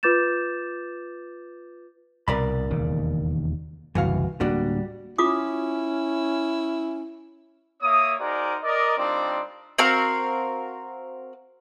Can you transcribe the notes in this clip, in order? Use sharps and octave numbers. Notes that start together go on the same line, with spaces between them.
F4 B4 D6 G6 A6 E7
C2 B2 A#4 D5 B5
E1 D#2 C#3
F#1 C2 F#2 E3 F#4 F5
D1 G3 A#3 D4 F#4 D5
C#4 E4 F4 D6 D#6
A#3 C#5 E5 D#6
D#4 F#4 G#4 A#4 C5 D5
A#4 D5 D#5
G3 C4 D4 D#4 F4 D5
C4 F#4 A#4 F5